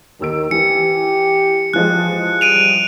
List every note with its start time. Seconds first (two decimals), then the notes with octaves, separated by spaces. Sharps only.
0.21 D#2 D#3 E6 D7
0.51 E3 G4 C#7
1.74 E3 F3 G#3 F#6
2.41 G3 D7 D#7 F7